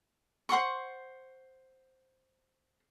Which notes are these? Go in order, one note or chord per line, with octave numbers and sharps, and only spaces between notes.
C5 F#5 C6 C#6